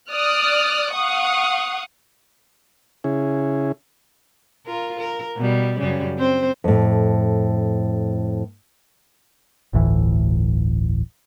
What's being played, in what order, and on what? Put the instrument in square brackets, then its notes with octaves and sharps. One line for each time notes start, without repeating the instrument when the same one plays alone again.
[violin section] D5 D#6 F6 F#6
F5 F#5 C#6 D#6
[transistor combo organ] C#3 C#4 E4 G#4
[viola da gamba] F4 A#4
A#4
B2 G3
F#2 C#3 G3
C4 C5
[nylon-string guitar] F2 A2
[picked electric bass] G1 D2 A2 E3